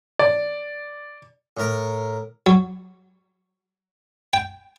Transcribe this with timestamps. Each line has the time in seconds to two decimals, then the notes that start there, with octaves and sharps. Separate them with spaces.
0.19 D5
1.57 A2 A#4
2.46 F#3
4.33 G5